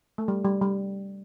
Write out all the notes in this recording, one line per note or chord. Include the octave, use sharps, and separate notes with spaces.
A3
G3
G3
G3